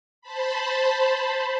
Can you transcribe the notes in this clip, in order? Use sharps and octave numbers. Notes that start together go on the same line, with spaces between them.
C5 A5 B5